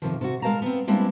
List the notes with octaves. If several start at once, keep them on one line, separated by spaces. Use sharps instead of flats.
F2 C3 D#3 F3
C3 F#4
G#3 A#4 C#5 F5 A5 A#5
B3 C4
G3 G#3 A#3 C4 D4 E4